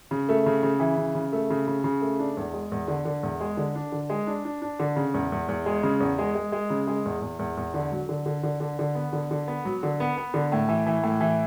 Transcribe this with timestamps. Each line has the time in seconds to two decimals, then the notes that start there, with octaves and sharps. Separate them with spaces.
0.11 C#3
0.29 A3
0.46 C#3
0.63 C#3
0.80 E3
0.97 C#3
1.15 C#3
1.33 A3
1.50 C#3
1.68 C#3
1.84 C#3
2.01 A3
2.19 D4
2.37 E2
2.53 G#3
2.72 E2
2.88 D3
3.05 D3
3.23 E2
3.41 G#3
3.57 D3
3.75 D4
3.92 D3
4.10 G#3
4.27 D4
4.45 D4
4.62 D4
4.80 D3
4.96 C#3
5.14 E2
5.32 E2
5.49 E2
5.66 G#3
5.83 C#3
6.00 E2
6.18 G#3
6.35 G#3
6.52 G#3
6.70 C#3
6.87 G#3
7.05 E2
7.22 E2
7.39 E2
7.57 E2
7.74 D3
7.92 F#3
8.09 D3
8.26 D3
8.43 D3
8.60 D3
8.79 D3
8.95 B3
9.13 D3
9.31 D3
9.48 B3
9.65 F#3
9.83 D3
10.00 B3
10.18 B3
10.34 D3
10.52 A2
10.69 E3
10.86 E3
11.04 A2
11.21 E3